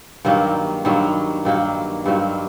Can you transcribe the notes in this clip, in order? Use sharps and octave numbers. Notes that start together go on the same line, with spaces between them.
G2 D#3 F#3 A#3
G2 D#3 F#3 A#3
G2 D#3 F#3 A#3
G2 D#3 F#3 A#3